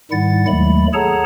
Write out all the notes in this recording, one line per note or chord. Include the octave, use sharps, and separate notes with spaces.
G#2 D#3 G3 E4 F#5 A6
D#2 D#3 F#3 G#3 A3 B5
G#4 A4 C#5 F#5 A5 A#5